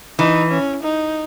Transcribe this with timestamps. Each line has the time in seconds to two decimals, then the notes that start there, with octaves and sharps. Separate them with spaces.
0.19 E3 D#4
0.51 C#4
0.83 D#4